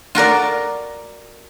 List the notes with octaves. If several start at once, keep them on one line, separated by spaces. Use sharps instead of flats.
F4 F#4 A#4 D5